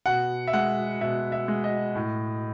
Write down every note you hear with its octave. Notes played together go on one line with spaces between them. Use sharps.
B2 F#5
E5
G#3 F#5
B2 E5
E5
G#3
D#5
A2